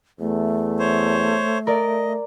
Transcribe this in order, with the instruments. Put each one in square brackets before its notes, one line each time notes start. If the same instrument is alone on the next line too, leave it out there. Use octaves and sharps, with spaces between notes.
[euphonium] E2 [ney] A3
[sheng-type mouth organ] C5 C#5
[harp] A#4 D5 [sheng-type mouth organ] D#5